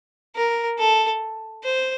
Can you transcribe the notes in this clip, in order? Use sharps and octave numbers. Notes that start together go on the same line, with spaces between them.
A#4
A4
C5